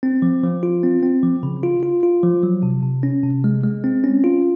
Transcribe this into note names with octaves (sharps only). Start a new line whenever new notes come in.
C4
F3
F3
F4
C4
C4
F3
C#3
F4
F4
F4
F3
F#3
C3
C3
C#4
C3
G#3
G#3
C4
C#4
F4